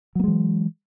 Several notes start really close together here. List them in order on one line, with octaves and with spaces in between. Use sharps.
F#3 A#3 G#3 E3